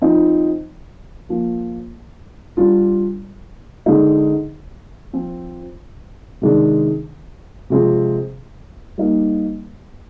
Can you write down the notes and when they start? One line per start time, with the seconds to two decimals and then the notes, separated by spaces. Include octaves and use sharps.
0.02 F3 C4 D#4
1.29 F3 A#3 F4
2.57 G3 D4 F4
3.86 D3 G#3 D#4
5.13 F3 C4 F4
6.41 C3 D#3 G#3 D4
7.70 C3 F3 G#3 C4 F4
8.98 G3 A#3 D#4